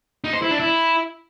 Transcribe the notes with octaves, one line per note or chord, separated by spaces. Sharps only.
D#4
C5
E4
D4
E4